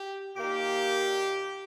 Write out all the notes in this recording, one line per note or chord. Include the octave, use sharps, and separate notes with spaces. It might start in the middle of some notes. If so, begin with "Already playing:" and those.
Already playing: G4
A#2 A#3 D#4 G4